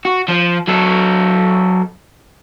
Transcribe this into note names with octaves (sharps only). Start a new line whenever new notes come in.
F#4
F3
F#3 A4